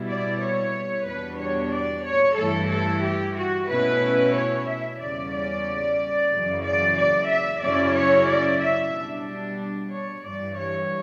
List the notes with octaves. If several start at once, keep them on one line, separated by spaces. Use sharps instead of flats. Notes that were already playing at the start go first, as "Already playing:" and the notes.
Already playing: B2 G3 B3 E4
D5
C#5
E2 B2 G3 D4 B4
C#5
D5
C#5
G2 E3 A3 E4 A4
A4
G4
F#4
B2 A3 C#4 E4 B4
C#5
E5
E2 C#3 G3 C#4 D5
D5
F#2 C#3 E3
D5
D5
E5
F#2 C#3 F#3 C#4 E4 D5
C#5
D5
E5
B2 G3 D4
C#5
G2 E3 G3 D5
C#5